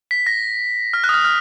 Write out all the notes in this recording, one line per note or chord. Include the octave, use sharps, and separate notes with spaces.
B6
A#6
F6
F#6
D#6
F6
F6